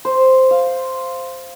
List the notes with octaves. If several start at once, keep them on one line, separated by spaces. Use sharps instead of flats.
C5
F5